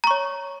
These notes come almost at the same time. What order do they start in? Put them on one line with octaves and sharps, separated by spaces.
A#5 C#6 C#5